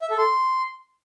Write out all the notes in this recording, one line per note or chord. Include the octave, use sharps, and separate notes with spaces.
E5
A4
C6